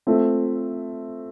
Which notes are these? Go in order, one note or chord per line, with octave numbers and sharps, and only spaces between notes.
A3 C4 F4